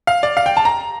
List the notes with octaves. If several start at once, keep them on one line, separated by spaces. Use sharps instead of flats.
F5
D5
F5
G5
A5
A#5